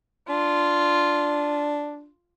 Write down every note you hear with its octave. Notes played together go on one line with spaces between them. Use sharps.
D4 F4